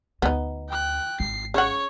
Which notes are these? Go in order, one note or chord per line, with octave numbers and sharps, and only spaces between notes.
D2 B3 D#4
G5 F#6
G#1 C7
C#3 C#5 F#5 C#6